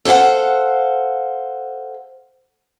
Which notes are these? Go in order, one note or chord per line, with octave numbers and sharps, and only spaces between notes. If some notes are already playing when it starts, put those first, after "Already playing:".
A4 C5 C#5 F5 F#5